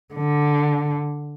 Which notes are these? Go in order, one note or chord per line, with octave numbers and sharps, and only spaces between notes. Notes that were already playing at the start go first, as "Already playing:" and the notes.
D3